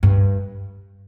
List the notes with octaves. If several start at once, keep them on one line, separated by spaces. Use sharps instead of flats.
G2